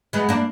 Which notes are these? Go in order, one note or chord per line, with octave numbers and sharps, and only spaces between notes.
G#3 B3
A#3 D4